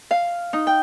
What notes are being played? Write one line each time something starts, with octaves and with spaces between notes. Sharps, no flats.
F5
D#4
G5